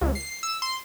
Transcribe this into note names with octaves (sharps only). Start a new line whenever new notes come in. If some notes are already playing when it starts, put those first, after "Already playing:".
C#2
C7
E6
C6